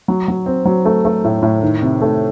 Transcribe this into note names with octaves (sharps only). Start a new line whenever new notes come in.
F#3
F#3
C4
F#3
A3
A3
A2
A2
D#3
C3
A3